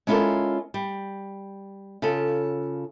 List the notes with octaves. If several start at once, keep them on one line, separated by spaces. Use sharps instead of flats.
G#3 C#4 E4 F4 A4 A#4
G3
C#3 F4 A4